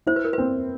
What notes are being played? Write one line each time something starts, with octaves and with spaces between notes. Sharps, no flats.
E4 C5
B4
A#4
C4 B4